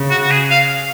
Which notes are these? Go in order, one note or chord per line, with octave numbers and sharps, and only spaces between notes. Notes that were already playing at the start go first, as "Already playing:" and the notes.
Already playing: C#3
F#4
F#4
G#4
F5